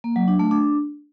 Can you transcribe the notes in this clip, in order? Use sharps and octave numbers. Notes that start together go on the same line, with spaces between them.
A#3
F#3
D4
A3
D4